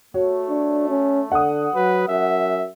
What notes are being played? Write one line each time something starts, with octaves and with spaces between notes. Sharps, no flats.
A3 F#4 C#5
D4
C#4
D3 F#5 D#6
F#3 B4
F#2 E5